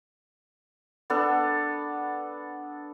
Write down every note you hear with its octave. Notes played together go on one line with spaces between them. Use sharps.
B3 D4 A4